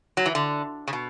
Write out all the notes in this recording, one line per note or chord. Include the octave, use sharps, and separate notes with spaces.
F#3
E3
D3
C#3
B2